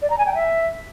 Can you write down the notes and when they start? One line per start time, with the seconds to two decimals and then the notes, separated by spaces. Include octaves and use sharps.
0.02 D5
0.10 A#5
0.18 G#5
0.26 G5
0.34 E5